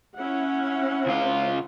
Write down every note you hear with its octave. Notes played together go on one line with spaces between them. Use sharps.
C#4 E4 F#5
C#2 F4